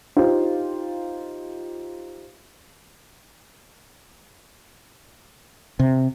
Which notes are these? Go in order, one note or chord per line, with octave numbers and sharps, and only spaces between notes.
D#4 F4 G4 C5
C3